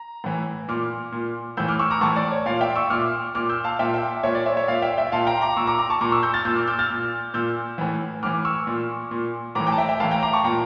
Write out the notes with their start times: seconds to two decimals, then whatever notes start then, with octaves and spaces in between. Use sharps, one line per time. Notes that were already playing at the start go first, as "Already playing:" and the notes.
Already playing: A#5
0.24 A2 E3
0.68 A#2 D6 F6
1.12 A#2
1.57 A2 E3 E6 G6
1.68 D6 F6
1.79 C#6 E6
1.90 A#5 D6
2.01 A2 E3 A5 C#6
2.16 D5
2.32 C#5
2.46 A#2 D5 F5
2.61 E5 G5
2.76 C#6 E6
2.90 A#2 D6 F6
3.35 A#2 D6 F6
3.49 E6 G6
3.64 F5 A5
3.79 A#2 E5 G5
3.94 E5 G5
4.23 A#2 C#5 E5
4.35 D5
4.46 C#5 E5
4.57 C#5 E5
4.68 A#2 D5 F5
4.82 E5 G5
4.98 E5 G5
5.12 A#2 F5 A5
5.27 G5 A#5
5.41 A#5 D6
5.57 A#2 C#6 E6
5.67 A#5 D6
5.79 A#5 D6
5.90 A5 C#6
6.01 A#2 A#5 D6
6.12 C#6 E6
6.23 E6 G6
6.34 F6 A6
6.45 A#2 E6 G6
6.56 D6 F6
6.67 E6 G6
6.79 F6 A6
6.90 A#2
7.34 A#2 E6 G6
7.78 A2 E3
8.23 A2 E3 D6 F6
8.45 C#6 E6
8.67 A#2
9.11 A#2
9.55 A2 E3 A#5 D6
9.67 G5 A#5
9.72 A5
9.78 E5 G5
9.89 E5 G5
10.00 A2 E3 F5 A5
10.11 G5 A#5
10.23 A#5 D6
10.33 A5 C#6
10.44 A#2 G5 A#5